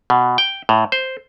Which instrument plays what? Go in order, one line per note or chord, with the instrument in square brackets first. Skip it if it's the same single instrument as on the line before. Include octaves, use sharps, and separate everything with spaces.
[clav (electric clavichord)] B2
G5
A2
C5